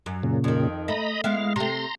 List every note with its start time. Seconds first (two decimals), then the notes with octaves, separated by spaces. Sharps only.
0.06 F#2
0.23 A#2 C#3
0.44 F2 D#3
0.88 A3 D#5 A#5 B5
1.24 G#3 B3 E4 F5
1.56 C3 A3 A#5 C6